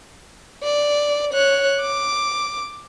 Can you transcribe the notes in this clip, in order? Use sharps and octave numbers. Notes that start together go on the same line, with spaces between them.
D5
C#5 F#6
D6